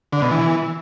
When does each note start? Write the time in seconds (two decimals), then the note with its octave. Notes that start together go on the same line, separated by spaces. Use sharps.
0.13 D3
0.22 B2
0.31 E3